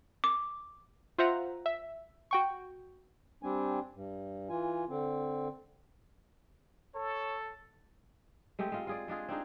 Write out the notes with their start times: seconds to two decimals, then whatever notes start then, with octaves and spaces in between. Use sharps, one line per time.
0.24 D6
1.18 F4 C5 E5 F#5 A#5
1.66 E5
2.31 F#4 G5 C#6
3.43 G3 C4 D4 G#5
3.94 G2
4.49 E3 F4 G#5
4.89 D3 C4
6.95 A4 C#5
8.59 G#3 A3 C4 G4
8.72 G#3 F4
8.87 F4 G#4 D5
9.08 G#3 D4 F4 G#4
9.29 C4 D4 D#4 G#4